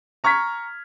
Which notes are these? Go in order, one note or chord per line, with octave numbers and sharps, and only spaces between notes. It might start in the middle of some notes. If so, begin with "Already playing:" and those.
A#5 C#6 F6 G#6 B6